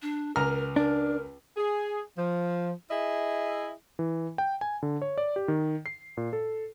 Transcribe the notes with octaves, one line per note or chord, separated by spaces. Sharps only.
D4
C#2 A#4 A#5 F6
D4 A#4
G#4
F3
E4 G#4 D#5 E5
E3
G5
G#5
D3
C#5
D5
G4
D#3
C7
A#2
A4